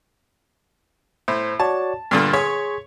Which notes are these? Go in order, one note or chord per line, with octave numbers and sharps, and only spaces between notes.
A2 C5
F#4 C#5 D5 A5
G2 A#2 D3 F6
G#4 C#5 C6 B6